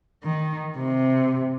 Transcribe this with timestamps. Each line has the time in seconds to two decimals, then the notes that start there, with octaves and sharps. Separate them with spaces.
0.24 D#3
0.77 C3